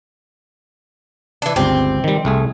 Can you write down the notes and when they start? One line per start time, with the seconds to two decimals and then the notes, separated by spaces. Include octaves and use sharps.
1.42 E3 D4
1.56 G1 C#2 C4 G4
2.04 D#3 G3
2.25 C2 A3 G#4